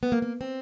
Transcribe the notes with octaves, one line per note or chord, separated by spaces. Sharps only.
B3
A#3
A#3
C4